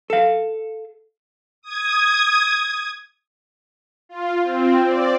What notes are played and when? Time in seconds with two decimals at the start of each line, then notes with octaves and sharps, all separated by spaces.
0.10 A4 F5
1.62 D#6 G#6
4.09 F4
4.43 C4
4.86 D5